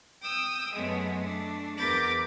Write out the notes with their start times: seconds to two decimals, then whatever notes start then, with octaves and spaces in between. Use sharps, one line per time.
0.22 G5 D#6 E6
0.74 F#2 G#3 A3 B3
1.20 A3 D4
1.77 E2 A#4 B5 D6 G6 A6